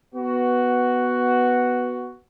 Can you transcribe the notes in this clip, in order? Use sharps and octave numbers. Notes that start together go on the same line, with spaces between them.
B3 F#4